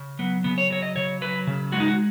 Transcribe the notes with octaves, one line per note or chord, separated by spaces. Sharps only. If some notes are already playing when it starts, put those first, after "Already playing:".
Already playing: C#3
F#3 B3
C#3 B3
C#5
F#3 C#5
D#5
C#3 C#5
F#3 B4
C#3
G#3 F#4
D#4
F#4